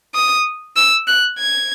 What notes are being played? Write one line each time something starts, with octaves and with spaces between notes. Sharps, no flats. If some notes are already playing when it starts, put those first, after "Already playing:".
D#6
E6
F#6
G#6